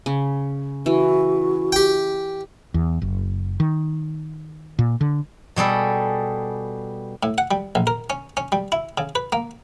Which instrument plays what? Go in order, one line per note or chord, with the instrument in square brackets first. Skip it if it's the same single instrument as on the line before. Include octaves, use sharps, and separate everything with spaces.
[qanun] C#3
[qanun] E3 [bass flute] F#4
[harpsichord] G4 G5
[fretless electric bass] E2
F#1
D#3
A#2
D3
[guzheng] B2 G3 G#4 A4
[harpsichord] A2
F#5
G3
A#1
A#4
C#4
C#4
G3
E4
C#3
B4
A#3